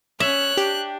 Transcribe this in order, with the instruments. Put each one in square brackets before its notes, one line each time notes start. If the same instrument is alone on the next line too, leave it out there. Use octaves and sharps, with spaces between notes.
[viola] C#4 C#5 [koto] E5 [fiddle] F#6
[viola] D4 [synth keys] G4